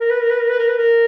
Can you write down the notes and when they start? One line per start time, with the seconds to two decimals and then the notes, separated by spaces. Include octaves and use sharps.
0.01 A#4
0.11 B4
0.20 A#4
0.30 B4
0.40 A#4
0.49 B4
0.59 A#4
0.68 B4
0.78 A#4